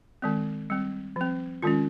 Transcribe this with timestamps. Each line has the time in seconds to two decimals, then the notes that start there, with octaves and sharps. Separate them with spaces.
0.22 D#3 G#3 C4
0.70 G3 C4
1.16 F3 C4
1.62 D#3 G#3 C#4 F4